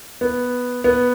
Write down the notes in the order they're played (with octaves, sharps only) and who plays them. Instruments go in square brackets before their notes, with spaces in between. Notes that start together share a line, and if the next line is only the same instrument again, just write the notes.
[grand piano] B3
B3